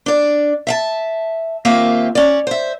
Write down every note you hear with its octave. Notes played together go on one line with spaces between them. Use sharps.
D4 D5
E5 F5 A5
D#2 A#3 C4 F4 E5 F5
C#4 D5
C5 E5